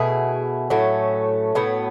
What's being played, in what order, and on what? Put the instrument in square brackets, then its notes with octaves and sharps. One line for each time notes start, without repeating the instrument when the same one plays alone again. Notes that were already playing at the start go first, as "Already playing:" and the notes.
Already playing: [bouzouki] B2 A3 E4 G#4
A2 F#3 A3 C#4
A2 F#3 B3